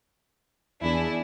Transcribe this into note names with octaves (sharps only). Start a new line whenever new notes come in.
E2 D4 E4 G#4